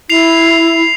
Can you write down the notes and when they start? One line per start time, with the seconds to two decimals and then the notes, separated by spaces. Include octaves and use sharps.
0.10 E4 C7 F7